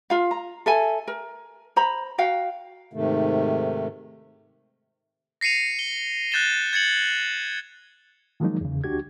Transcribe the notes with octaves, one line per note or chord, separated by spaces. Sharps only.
F4 F5
A#5
A4 E5 G#5
A#4
C5 A#5 B5
F#4 F5 G5
G#2 C3 D#3 A3
A#6 C7 C#7 D#7 F7
G7
F#6 G6 A6 E7 G7
G#6 A6 C#7 F#7
D#3 F3 F#3 G#3 A#3 D#4
E2 C#3
D2 D4 F#4 G4 G#6